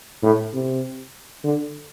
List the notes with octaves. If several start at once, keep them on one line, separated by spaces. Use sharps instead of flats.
A2
C3
D3